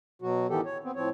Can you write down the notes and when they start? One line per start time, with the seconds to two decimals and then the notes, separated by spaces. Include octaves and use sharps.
0.22 B2 F#3 F#4
0.49 A2 D#3 E3 B3 G4 A4
0.66 C#5
0.84 B3 C4
0.96 A2 F3 C4 C#5